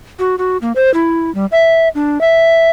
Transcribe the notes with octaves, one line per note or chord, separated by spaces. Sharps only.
F#4
F#4
A#3
C5
E4
G3
E5
D4
E5